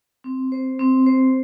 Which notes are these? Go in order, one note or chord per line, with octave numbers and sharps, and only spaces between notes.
C4
C5
C4
C5